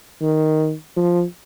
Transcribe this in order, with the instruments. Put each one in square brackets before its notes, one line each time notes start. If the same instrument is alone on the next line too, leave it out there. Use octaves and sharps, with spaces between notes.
[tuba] D#3
F3